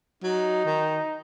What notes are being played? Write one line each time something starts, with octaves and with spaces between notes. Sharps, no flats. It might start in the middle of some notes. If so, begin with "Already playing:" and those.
F#3 D#4
D#3